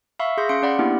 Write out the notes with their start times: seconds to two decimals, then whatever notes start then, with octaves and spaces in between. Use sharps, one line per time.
0.19 E5 F5 B5 C#6 E6
0.37 G#4 C6 G6 A#6
0.49 C#4 F5 C6 C#7 D7
0.62 C#4 D5 F#5 B5
0.79 A#3 B3 D4 E4 G4